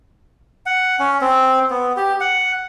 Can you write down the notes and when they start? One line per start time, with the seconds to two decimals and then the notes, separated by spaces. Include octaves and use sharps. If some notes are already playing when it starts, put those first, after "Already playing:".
0.66 F#5
0.99 C#4
1.21 C4
1.70 B3
1.97 G4
2.20 F#5